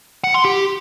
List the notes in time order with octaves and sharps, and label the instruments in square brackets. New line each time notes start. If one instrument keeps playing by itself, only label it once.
[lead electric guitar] F#5
C6
G4